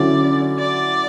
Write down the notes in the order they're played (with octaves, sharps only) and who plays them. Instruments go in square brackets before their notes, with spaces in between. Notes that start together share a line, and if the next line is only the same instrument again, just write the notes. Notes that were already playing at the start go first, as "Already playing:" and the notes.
Already playing: [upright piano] D3 F#3 C#4 E4 [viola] D5
[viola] D5